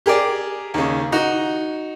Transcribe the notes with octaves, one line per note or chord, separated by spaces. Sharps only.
G4 G#4 A#4 D5
D#2 C#3
D#4 F#4